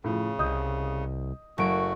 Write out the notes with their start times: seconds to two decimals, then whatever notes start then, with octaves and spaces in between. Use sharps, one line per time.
0.04 A2 C#3 F3
0.39 C2 D#5 D#6 G6
1.58 F#1 A3 F#4 D7